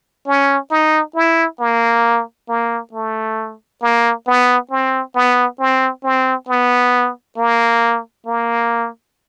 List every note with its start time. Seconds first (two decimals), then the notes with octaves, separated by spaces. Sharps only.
0.27 C#4
0.71 D#4
1.15 E4
1.60 A#3
2.49 A#3
2.93 A3
3.82 A#3
4.27 B3
4.71 C4
5.15 B3
5.60 C4
6.04 C4
6.48 B3
7.37 A#3
8.26 A#3